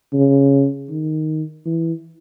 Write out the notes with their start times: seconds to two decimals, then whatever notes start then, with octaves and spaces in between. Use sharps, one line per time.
0.14 C#3
0.90 D#3
1.66 E3